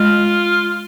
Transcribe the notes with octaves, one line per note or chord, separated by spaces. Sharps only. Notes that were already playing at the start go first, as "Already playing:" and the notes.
Already playing: G#3 F4